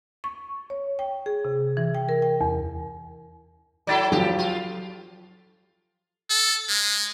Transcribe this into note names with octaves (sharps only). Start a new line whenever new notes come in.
C#6
C#5
G5
G#4
C3
E3
G5
A#4
G5
E2
F#3 E4 A4 D5 A6
F3 F#3 G4
F4
A4
G#3